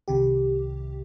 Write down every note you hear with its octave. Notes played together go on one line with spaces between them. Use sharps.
C2 C3 D#3 G4